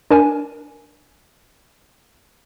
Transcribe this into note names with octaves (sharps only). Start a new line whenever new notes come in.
D4 A#4 G#5